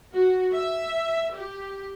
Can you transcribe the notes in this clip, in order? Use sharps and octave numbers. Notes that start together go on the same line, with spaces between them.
F#4
E5
G4